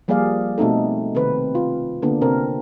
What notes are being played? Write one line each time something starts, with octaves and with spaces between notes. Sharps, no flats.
F3 G3 A#3 G#4 D5 F5
B2 A3 C4 D#4 A4
C3 D#3 C4 B4
F4
D3 A#3 B3 D4
C3 C4 A#4